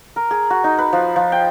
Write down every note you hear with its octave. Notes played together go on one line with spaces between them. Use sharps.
A#4
G#4
F#4
D#4
B4
F3
F3
G5